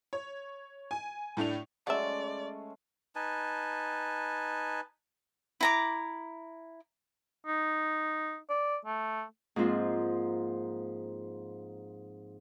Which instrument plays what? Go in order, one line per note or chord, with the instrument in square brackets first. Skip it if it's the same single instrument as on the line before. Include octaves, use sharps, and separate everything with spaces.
[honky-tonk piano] C#5
G#5
A2 A3 D4 F7
[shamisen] F#3 E5 [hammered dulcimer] G#3 A3 C#4 [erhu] D5
[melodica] D#4 B4 G#5 A5
[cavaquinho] E4 A#5 D6
[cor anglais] D#4
D5
A3
[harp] G#2 F3 A#3 C4 F4